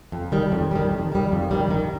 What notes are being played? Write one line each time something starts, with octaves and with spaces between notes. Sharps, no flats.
F2
D#3 G3
F2
D#3 G3
F2
D#3 G3
F2
D#3 G3
D#3